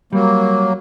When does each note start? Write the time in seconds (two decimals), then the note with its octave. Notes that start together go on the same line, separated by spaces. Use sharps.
0.13 F#3 G3 A#3